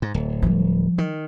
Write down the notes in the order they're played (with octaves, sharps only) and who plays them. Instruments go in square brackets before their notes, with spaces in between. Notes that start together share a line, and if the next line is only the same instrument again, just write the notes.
[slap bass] G#2
D1
[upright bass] F3 G3
[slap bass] D#3